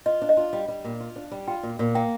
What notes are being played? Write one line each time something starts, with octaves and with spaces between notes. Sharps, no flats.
F4 D#5
D4
D#5
F4
G3
G3
A#2
F4
D4
G3
F4 G5
A#2
A#2
A#3 G5